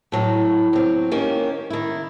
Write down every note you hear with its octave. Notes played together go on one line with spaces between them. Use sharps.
A2 F#3
F#3 C4
D#3 A#3 C#4 G4
D#3 E4